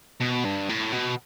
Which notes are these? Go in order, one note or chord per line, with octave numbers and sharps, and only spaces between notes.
B2
G2
A2
B2